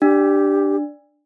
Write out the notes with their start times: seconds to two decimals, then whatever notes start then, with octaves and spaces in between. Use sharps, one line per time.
0.02 D4 G4